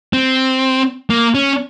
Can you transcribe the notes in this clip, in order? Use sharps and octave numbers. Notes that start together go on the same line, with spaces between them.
C4
A#3
C#4